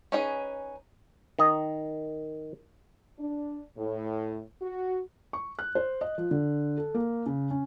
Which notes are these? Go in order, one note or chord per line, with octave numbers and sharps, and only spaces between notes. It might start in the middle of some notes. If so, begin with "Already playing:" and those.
C#4 D#4 G#4 B4
D#3 D#5
D4
A2
F#4
C#6
F#6
C5
D#5
F3
D3
A4
A#3
C#3
C#4